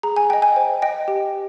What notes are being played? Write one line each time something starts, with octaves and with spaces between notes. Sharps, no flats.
G#4 A#5
G#5
D#5 G5
G#5
C5
D#5 G5
G4